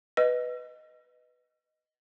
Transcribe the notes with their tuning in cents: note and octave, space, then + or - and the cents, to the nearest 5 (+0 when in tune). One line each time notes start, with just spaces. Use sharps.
B4 +0 D#5 +0 E6 +45